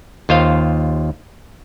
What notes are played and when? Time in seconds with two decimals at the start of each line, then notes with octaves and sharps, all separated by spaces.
0.29 D#2 F4 C5 F5